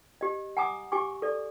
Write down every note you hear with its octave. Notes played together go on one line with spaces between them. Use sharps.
G4 D#5
F#5 G#5 A#5 D6 D#6
G4 G#5 C#6 D6
A4 D5